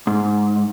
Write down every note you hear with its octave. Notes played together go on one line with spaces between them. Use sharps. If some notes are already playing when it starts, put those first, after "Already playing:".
G#2